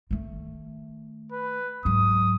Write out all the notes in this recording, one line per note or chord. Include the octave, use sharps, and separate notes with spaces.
D#3 A3
B4
G#2 F#3 D#6